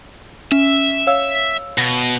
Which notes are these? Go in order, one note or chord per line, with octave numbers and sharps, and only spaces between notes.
C#4 E5
C#5 F5 E6
B2 A#6